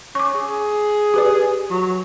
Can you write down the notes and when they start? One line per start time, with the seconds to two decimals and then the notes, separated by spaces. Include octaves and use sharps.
0.15 C#4 C#6 D6
0.34 G#4
1.14 G4 B4 D5
1.70 F#3